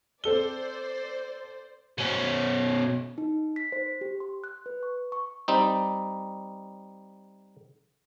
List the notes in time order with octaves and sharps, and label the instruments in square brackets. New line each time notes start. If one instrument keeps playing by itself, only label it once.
[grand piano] C4 A4 G7 [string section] C5 D5
[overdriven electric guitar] B2 C#4
[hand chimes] D#4
B6
C5
G4
C6
F#6
B4
C#6
C#6
[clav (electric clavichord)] G3 C4 D#4